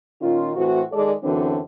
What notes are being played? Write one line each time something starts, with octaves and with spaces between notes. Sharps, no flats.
A#2 D#3 C#4 F4
A2 E3 A3 C4 F#4
D#3 G#3 G#4 A4 D5
F#2 D3 E3 F#3 C4 D4